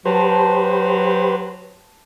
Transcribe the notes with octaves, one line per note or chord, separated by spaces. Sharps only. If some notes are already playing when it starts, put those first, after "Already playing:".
F#3 G4 B4 C5 A5